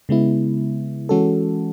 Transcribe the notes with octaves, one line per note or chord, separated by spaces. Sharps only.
C#3 G#3 B3 E4
E3 G#3 C#4 F#4 A4